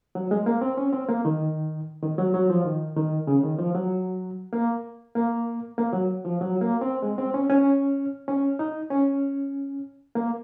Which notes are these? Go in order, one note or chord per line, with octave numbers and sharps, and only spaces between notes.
F#3
G#3
A#3
C4
C#4
C4
A#3
D#3
D#3
F#3
F#3
F3
D#3
D#3
C#3
D#3
F3
F#3
A#3
A#3
A#3
F#3
F3
F#3
A#3
C4
G#3
C4
C#4
C#4
C#4
D#4
C#4
A#3